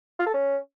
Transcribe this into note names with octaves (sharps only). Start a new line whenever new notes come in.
F4
A4
C#4